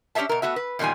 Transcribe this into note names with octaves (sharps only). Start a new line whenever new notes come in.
C#4 D4 G4 A4 E5 A5
B2 A#4
A3 B3 F#4 E5
B4
E2 A#2 D#3 G3 G#5